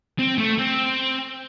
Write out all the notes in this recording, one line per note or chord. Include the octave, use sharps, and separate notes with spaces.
C4
A3
C4